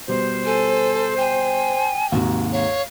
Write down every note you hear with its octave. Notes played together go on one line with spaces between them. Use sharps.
B2 G3 C5
A4 G#5
G5 G#5
D#2 G#2 C3 F#4
C#5 F5